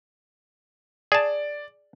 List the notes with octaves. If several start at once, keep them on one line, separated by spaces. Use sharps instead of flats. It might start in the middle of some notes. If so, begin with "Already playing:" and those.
G#4 D5 A5